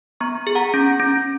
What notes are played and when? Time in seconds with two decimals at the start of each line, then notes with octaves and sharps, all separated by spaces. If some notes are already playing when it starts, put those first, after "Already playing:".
0.21 B3 A#5 C#6
0.47 G#4
0.55 F#5 A#5
0.74 C#4
1.00 C#4